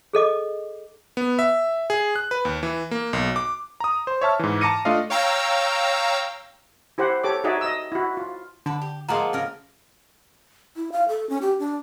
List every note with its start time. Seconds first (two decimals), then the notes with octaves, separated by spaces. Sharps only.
0.13 G#4 A4 D#5 D6
1.17 B3
1.39 E5
1.90 G#4
2.16 F#6
2.31 B4
2.45 D#2
2.63 E3
2.91 A#3
3.13 B1
3.36 D6
3.80 A#5 D#6
4.07 C5
4.21 C#5 E5 A5 F6
4.39 G#2 E3
4.61 A5 A#5 D6 A#6 C#7 D#7
4.85 A3 D4 F4 D#5 F5
5.10 C#5 F5 G5 A#5 E6
6.98 E4 G4 C5 F#5
7.24 G4 A4 C#5 D6
7.44 D#4 F#4 G#4 D5 E5
7.61 D#5 E6
7.92 E4 F#4
8.17 F4
8.66 D3 B4 D5 A5
8.81 G4
9.09 F3 G#3 A#3 D#5 F#5 A5 A#5 C6
9.33 C#3 A#4
10.76 E4
10.92 F5
11.09 A4
11.30 C#4
11.42 G4
11.60 D4